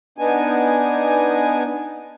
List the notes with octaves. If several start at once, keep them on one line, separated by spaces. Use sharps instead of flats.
B3 D4 D#4 G#5